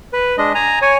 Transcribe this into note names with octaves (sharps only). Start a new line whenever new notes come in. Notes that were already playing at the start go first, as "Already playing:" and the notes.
B4
G#3 D4 D#5
G#5 A#5
C#5 G#5